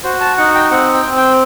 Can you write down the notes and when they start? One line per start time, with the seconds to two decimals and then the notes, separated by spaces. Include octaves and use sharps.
0.04 F#4 C5
0.21 A5
0.37 D#4 F#5
0.55 G5
0.71 C4 F#5
0.94 G5
1.05 C4
1.17 G5